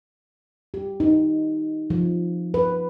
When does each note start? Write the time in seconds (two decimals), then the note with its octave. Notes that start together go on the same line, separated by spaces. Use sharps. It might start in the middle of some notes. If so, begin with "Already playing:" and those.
0.74 G4
1.00 D#4
1.90 F3
2.54 B4